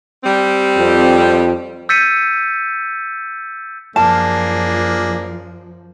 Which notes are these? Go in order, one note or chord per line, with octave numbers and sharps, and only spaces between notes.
G3 C4
F2
E6 G6 A6 B6 C#7 D#7
F#2 F3 A#3 D4 G#4 A5